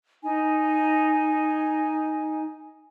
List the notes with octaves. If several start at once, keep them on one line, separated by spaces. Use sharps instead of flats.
D#4 G#5